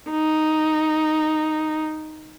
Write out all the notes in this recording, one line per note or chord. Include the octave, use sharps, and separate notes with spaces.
D#4